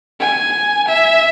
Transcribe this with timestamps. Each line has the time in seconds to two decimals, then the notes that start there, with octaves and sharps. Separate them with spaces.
0.20 G#5
0.88 E5